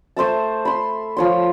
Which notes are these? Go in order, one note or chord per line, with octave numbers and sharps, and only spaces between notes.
A3 C5 E5 A5
B5 C6
F3 C#5 C6